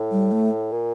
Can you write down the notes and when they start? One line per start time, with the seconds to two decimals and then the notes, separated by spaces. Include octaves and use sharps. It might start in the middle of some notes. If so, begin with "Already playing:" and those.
Already playing: A2
0.12 G3
0.32 A3
0.72 A#2